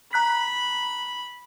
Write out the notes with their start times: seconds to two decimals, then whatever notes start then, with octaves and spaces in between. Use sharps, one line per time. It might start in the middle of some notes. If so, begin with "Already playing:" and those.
0.13 A#5 B5 F#6 B6